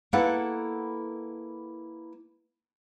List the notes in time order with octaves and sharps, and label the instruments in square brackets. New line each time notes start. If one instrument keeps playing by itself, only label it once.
[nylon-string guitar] A#3 E4 A4 B4 F#5